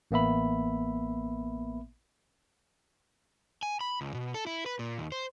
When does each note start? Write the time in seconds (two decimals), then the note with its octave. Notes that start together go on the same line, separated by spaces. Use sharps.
0.11 A1 A#3 B3 E5 B5
3.63 G#5
3.81 B5
4.01 C#2
4.14 B2
4.34 A4
4.47 E4
4.66 B4
4.79 A#2
4.98 D#2
5.12 C5